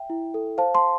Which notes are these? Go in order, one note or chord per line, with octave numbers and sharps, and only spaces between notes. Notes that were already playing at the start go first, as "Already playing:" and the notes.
Already playing: E5 G5
E4
A4
C5 F5 A5
A5 C6